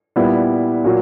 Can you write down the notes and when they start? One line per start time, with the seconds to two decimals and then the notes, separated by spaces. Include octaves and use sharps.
0.16 A#2 G3 B3 E4
0.84 A#2 F#3 A#3